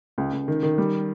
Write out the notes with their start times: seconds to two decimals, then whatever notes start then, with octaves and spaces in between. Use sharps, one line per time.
0.18 C#2
0.33 C#2
0.48 D#3
0.63 D#3
0.78 G3